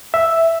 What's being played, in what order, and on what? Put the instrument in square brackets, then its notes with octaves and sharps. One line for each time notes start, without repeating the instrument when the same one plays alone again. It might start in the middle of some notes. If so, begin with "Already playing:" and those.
[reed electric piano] E5